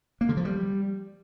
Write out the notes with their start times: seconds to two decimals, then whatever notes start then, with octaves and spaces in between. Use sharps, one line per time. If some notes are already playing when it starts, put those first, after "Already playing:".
0.21 A#3
0.29 D3
0.37 F3
0.45 G3